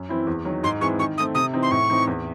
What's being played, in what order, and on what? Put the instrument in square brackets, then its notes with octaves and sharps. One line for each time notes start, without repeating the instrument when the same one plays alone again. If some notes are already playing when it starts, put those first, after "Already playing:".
Already playing: [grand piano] F#2
E3 C4 E4
E2
D#3 F#3
[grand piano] G#2 [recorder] C6
[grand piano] E3 G#3 C4 [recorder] C#6
[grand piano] D#3 [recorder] C#6
[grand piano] A3 [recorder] D#6
[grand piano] C4
[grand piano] C3 [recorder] D#6
[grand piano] E3 C4 D#4
[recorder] C6
[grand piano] A2 [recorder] C#6
[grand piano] E3 C4 D#4
E2